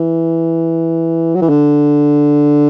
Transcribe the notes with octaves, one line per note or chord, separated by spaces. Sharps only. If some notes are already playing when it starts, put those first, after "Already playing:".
Already playing: E3
F#3
E3
D3